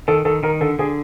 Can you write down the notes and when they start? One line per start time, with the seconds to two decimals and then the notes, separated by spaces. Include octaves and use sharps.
0.08 D#3 A4
0.25 D#3 A4
0.43 D#3 A#4
0.61 D3 A4
0.79 D3 G#4